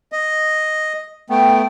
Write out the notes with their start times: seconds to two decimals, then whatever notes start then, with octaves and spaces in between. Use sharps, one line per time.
0.12 D#5
1.30 A3 B3 G5